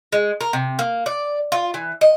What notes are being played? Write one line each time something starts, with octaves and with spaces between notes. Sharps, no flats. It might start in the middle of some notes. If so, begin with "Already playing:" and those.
G#3
A#4
C3
A#3
D5
F4
E3
D#5